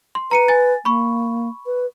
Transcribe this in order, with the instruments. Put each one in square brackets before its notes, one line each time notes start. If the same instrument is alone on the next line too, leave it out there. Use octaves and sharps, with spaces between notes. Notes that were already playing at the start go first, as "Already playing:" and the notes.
[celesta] C6
[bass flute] B4 [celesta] A#5 C#7 D#7
[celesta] G#5 A6
[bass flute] A#3 [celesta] B5 C#6
[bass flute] B4